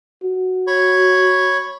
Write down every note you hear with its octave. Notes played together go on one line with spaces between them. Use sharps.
F#4
C#5 B5 C#6